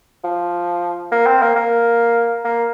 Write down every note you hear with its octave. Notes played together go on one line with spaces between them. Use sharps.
F3
A#3
C4
A#3
A#3
A#3